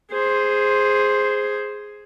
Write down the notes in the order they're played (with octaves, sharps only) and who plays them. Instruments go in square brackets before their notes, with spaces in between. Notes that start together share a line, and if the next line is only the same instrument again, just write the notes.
[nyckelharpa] G#4 C5